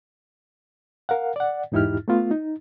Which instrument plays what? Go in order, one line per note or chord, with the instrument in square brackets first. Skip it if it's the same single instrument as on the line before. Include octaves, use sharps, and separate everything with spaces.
[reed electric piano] A#4 F5 F#5
D5 F#5
E2 G#2 D#4 E4 G4 F6
A3 B3 F4
D#4